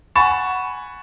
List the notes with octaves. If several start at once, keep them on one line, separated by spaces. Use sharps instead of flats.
F#5 G#5 B5 C#6 A6 E7